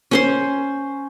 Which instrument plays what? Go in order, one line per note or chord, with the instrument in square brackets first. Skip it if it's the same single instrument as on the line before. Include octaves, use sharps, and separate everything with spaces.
[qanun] C#4 C5 C6